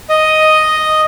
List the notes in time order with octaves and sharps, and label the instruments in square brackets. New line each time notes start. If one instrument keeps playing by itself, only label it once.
[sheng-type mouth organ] D#5